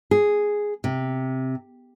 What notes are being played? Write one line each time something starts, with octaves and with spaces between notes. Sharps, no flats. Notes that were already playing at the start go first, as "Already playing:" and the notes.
G#4
C3